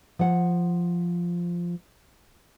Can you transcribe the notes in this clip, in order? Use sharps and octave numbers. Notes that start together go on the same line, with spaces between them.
F3 F#5